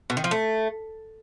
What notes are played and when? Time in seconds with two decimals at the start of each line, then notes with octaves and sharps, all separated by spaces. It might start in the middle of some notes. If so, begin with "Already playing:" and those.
0.10 B2
0.17 D#3
0.24 F3
0.31 A3